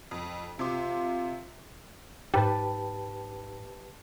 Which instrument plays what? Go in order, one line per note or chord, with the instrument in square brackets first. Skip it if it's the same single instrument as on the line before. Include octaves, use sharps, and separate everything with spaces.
[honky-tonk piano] F2
[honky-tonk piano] C3 C6 D6 [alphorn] F4
[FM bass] G#2 [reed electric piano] G4 B4 A5